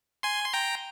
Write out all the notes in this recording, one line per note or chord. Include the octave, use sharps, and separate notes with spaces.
G#5 C6
C6
G5 A#5